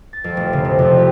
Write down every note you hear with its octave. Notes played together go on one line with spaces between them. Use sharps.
A6
F2
F1
C#3
C3
F2
G4